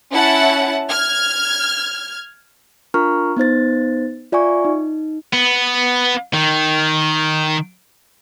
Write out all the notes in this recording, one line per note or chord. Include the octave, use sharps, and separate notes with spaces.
C#4 E4 F#5 A5
F6 G#6
D4 F4 A#4 A#5 C#6 F6
B3 D#4 C5 A6
F4 D5 E5 G#5 C#6
D#4
B3
D#3